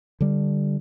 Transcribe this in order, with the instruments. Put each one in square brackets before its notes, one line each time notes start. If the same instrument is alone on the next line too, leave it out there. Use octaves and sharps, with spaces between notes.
[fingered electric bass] D3 G3